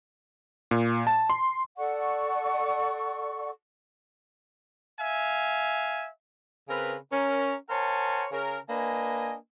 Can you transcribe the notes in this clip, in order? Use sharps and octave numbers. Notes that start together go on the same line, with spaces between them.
A#2
A5
C6
A4 D5 F#5 C#6
E5 F5 G#5
C#3 C4 A#4 B4
C#4 A#4
A#4 C5 C#5 F#5 G#5 A5
C#3 A#4
A#3 D4 B4 D#5 G#5